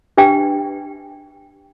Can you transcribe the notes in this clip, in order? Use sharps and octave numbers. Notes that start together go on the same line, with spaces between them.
D4 G4 B4 G5